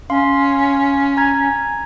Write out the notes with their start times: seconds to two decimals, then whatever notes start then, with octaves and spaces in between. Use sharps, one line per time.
0.10 C#4 F5 C6
1.17 G#5 A#5 G#6